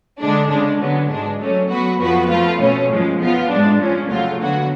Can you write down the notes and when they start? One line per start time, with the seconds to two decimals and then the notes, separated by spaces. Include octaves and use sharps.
0.21 D3 G#3 D4
0.50 C#3 G#3 D4
0.80 D3 F#3 B3
1.10 G#2 G#3 D4
1.40 F#3 A3 C#4
1.70 F#3 B3 F#4 B4
1.99 F2 F3 B3 F#4 B4
2.30 F3 A3 F4 B4
2.59 B2 A3 C#4
2.89 F#2 F3 G#3
3.19 F3 B3 F4
3.49 A2 G#3 D4
3.79 F3 G#3 C#4
4.09 F2 C#3 F#3 A3 F4
4.39 D3 F#3 B3 F#4